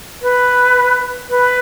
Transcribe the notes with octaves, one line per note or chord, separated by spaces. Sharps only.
B4
B4